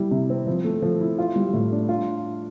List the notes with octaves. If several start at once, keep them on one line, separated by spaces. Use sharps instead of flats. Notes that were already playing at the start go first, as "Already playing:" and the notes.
Already playing: G3 E4
C3
C4
F3
A3
F3
E4
F4
G3
A2
D4
F4